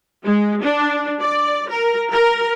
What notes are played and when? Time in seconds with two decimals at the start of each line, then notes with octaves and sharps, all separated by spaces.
0.24 G#3
0.63 D4
1.20 D5
1.69 A#4
2.11 A#4